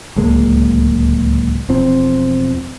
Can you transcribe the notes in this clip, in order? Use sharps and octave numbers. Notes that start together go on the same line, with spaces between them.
D1 C#2 G#3 A#3
E1 F3 C4